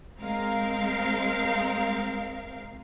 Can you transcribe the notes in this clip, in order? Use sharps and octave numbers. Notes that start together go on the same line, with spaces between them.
G#3 C4 A#4 F5